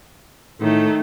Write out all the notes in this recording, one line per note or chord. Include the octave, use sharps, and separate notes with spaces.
A2 D#3 A3